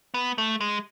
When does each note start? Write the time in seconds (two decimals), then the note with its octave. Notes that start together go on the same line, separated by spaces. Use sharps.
0.14 B3
0.38 A3
0.61 G#3